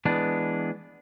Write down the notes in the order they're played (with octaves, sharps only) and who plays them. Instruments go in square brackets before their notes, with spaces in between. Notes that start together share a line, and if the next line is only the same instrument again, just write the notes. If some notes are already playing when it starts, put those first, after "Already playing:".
[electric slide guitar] E3 G#3 B3 D4